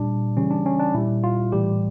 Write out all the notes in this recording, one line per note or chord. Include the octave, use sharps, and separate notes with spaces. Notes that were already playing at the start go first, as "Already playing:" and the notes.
Already playing: A#2 G3 D4
C#3 E3 G3 C#4
D4
C#4
D4
A#2 G3 E4
F4
A2 E3 G3 G4